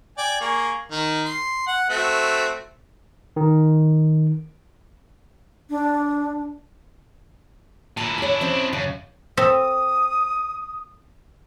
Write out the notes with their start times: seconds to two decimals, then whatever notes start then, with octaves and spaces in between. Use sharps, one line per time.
0.18 D5 G5 G#5
0.41 A#3 G#4 C#6
0.91 D#3
1.25 C6
1.67 F#5
1.90 A3 C4 F#4
3.36 D#3
5.70 D4
7.97 A#2 E4 A5
8.18 D4 E4 C#5 G#5
8.41 C4 C#4 C5
8.73 F#2 C#3
9.37 C4 A4 E5 D#6